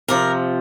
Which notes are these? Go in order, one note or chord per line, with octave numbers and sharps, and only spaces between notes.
C3 F3 A#4